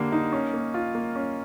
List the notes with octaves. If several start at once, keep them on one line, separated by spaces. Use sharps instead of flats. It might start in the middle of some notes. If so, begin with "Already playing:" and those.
Already playing: D3 G3 A#3
D#4
C#4
A#3
F4
A#3
C#4